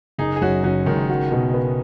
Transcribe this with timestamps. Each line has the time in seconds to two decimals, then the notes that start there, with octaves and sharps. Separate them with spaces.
0.18 F#1 D#4 G#4
0.36 G#4
0.41 F#2 C#4 F#4
0.64 F#1 C#4 F#4
0.86 F#1 D#3 G#3
1.10 F#4
1.32 B2
1.54 B3